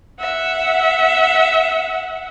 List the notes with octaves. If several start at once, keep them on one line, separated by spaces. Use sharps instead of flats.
E5 F#5